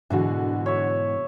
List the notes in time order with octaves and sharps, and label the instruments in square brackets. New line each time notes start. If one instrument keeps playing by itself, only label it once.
[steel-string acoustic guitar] G#2 B2 E3 [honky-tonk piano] D3 F#4
[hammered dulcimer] C#5 E5